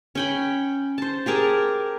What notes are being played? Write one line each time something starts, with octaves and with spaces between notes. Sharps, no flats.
C#4 G5 B5
C5 A5
G4 G#4 A#4 A5